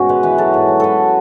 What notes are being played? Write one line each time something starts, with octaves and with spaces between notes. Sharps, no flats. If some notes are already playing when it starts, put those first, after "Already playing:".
Already playing: G#2 B2 C#4 F#4
G#3 B4
E3 B4
F#3 A4
G#2
F#3
F#3 A4 B4